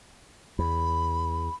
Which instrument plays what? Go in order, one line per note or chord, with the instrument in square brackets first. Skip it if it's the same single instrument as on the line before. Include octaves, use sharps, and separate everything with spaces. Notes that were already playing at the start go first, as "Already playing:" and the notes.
[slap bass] E2 [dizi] B5